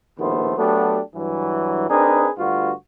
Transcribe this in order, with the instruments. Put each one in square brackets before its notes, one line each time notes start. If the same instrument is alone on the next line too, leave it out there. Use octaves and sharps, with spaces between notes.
[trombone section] A#1 D#2 B2 A3 B3 C5
F#3 A3 B3 D4 F#4 G4
G2 E3 F#3
C4 D4 D#4 G#4 A#4 B4
D2 G2 F4 F#4